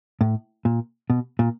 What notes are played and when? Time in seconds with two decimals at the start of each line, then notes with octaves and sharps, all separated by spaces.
0.21 A2
0.65 A#2
1.10 B2
1.39 A#2